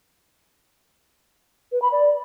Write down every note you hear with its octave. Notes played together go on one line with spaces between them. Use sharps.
B4
B5
D5